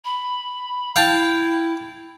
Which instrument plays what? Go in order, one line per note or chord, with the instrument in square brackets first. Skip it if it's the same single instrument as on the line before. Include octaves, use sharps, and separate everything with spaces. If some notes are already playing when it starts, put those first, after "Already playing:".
[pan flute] B5
[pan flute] E4 [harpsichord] F5 G5 A5